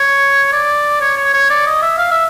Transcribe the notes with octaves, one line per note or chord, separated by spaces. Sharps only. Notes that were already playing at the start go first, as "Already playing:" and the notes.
Already playing: C#5
D5
C#5
C#5
C#5
D5
D#5
E5
F5
E5